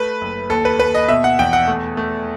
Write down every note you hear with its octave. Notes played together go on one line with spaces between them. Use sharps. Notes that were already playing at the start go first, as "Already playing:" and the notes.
Already playing: A3 B4
F#1
D#2 A4
B4
D#2 B4
D#5
B2 E5
F#5
E2 G5
F#5
A3
A3